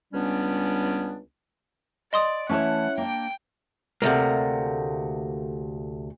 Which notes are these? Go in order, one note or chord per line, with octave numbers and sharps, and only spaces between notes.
C#2 G3 B3 C#4 D4
D5 D#5 C6 D#6
E3 A3 C#4 E4 C#5 F#5 A5
A#3 D4 G5
D2 C3 A3 A#3